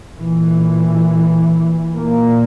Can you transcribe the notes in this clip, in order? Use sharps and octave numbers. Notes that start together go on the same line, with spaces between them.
A#2 E3
A#2 A#3